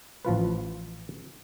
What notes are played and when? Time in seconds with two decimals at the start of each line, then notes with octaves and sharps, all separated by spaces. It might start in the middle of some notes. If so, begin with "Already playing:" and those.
0.25 A1 F3 F4 B4